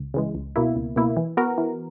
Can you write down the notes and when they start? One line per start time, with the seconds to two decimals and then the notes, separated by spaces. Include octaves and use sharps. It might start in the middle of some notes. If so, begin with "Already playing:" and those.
Already playing: C#2
0.14 C#3 E3 G#3
0.35 C#2
0.56 B2 A#3 E4
0.76 C#2
0.96 B2 A#3 E4
1.17 E3
1.37 B3 F#4 A#4
1.58 E3